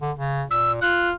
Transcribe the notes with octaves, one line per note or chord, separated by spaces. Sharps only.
D3
C#3
A#2 E6
F4 F#6